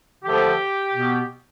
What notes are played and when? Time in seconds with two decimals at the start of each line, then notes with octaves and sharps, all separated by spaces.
0.23 D3 F3 A3 G4
0.93 B2 B3